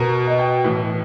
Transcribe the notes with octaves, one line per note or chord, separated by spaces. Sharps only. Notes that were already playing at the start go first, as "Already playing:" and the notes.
Already playing: B2 A#4
D#5
G5
A2 E3